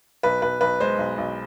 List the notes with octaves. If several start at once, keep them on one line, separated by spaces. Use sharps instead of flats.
B1 B4
B1 B4
B1 B4
G#3 C5
B1
B1